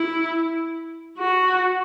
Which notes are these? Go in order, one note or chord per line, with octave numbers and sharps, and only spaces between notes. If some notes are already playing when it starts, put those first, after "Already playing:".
Already playing: E4
F#4